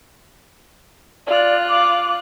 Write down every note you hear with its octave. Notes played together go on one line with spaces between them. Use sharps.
F4 D5 F#6
D6